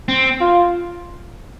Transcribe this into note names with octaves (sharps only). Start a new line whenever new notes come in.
C4
F4